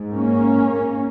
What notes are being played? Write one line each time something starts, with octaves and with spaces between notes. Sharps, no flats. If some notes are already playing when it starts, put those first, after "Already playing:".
Already playing: G#2
A#3 C#4